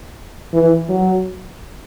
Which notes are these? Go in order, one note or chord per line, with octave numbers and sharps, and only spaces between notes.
E3
F#3